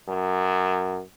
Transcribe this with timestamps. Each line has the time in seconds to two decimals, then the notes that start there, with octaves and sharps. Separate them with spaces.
0.09 F#2